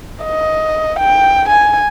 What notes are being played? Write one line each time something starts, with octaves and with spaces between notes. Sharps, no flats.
D#5
G5
G#5